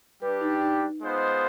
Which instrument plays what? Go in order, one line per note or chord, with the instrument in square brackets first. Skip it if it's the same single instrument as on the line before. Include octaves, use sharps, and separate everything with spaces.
[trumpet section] G3 D4 G4 [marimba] B4
[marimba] D#4
D#4
[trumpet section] G#3 B3 F4 C5 D#5